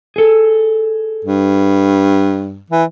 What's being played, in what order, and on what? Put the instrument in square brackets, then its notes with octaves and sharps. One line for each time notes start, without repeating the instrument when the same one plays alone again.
[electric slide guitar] G#4 A4
[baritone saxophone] G2
E3